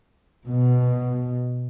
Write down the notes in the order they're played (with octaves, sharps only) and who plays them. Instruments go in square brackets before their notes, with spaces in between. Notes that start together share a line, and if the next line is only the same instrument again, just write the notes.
[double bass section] B2